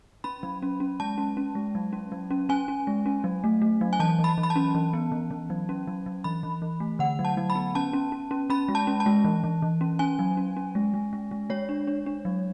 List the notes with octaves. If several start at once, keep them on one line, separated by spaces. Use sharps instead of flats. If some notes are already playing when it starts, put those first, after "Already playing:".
C#4 B5
F#3
C#4
C#4
G#3 A5
C#4
C#4
G#3
F#3
C#4
F#3
C#4
C#4 G#5
C#4
G#3
C#4
F#3
A3
A3
F#3
G#5
E3 A5
E3
B5
E3
B5
A5
C#4
E3
B3
E3
E3
F#3
C#4
F#3
F#3
E3 B5
E3
E3
A3
D3 F#5
F#3
A5
F#3
B5
B3
C#4 A5
C#4
C#4
C#4
C#4 B5
G#3
A5
C#4
A5
G#3
E3
E3
E3
C#4
C#4 G#5
F#3
C#4
C#4
G#3
G#3
G#3
G#3
G#3 C#5
D4
D4
D4
F#3